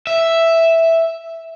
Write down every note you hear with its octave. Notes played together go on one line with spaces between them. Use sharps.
E5